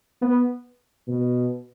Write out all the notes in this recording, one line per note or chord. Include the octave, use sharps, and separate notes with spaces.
B3
B2